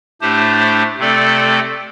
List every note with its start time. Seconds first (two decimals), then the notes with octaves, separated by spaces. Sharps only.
0.21 A2 A3 D4 G4 C5
0.98 C3 A3 C4 A4 D5